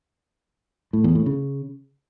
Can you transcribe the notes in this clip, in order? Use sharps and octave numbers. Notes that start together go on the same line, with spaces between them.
A2
E2
A2
C#3